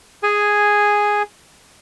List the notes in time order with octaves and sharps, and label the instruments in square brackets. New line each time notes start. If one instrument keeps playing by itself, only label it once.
[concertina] G#4 G#5